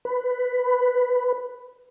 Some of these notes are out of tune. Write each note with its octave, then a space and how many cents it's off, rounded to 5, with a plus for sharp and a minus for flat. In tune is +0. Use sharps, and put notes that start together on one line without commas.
B4 +10